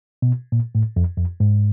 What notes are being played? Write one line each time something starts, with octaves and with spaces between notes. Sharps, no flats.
B2
A#2
A2
F2
F2
G#2